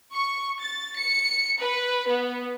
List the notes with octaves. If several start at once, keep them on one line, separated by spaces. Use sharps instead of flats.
C#6
A6
C#7
B4
B3